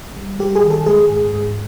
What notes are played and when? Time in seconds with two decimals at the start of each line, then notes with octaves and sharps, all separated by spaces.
0.17 G3
0.39 G3 G4
0.55 G#4
0.64 D#3
0.70 A4
0.86 G#3 G#4
1.10 G#2
1.33 G#2